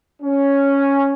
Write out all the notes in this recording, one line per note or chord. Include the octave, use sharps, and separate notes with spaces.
C#4